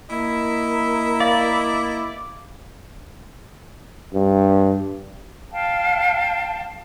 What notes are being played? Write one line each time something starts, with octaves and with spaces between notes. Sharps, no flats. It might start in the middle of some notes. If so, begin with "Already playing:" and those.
A#3 E4 D#5
D5 F5
G2
F5 G5 A5